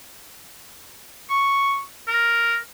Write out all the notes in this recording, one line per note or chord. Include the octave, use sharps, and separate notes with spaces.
C#6
A#4